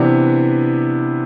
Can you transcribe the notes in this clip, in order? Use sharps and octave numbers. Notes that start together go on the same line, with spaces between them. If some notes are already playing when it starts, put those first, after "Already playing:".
Already playing: C3 E3 B3 D4